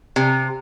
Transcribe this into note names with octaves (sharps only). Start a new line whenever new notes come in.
C3